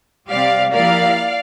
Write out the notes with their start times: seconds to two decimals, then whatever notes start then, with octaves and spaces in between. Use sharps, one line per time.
0.29 C3 G3 C4 G4 D5 F5
0.73 F3 A#3 E4 G4 A#4 D5 F5